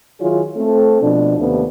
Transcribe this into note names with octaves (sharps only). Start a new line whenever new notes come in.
D#3 F#3 E4 F4 G#4 C#5
A3 C4 A4
B2 F3 D4
D#2 C3 A3 B3 C4 D4